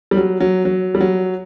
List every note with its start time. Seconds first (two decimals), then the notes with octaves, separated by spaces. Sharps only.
0.11 G3
0.17 F#3
0.40 F#3
0.65 F#3
0.95 G3
1.01 F#3